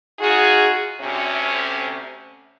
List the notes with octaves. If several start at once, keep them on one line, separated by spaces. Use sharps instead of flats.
D#4 F4 F#4 G#4
D2 C3 C#4